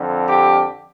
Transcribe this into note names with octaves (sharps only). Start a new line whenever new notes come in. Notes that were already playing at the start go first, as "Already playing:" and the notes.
Already playing: F2 D3
G4